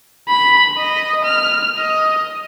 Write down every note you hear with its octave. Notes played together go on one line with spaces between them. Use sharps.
B5
D#5
F6
D#5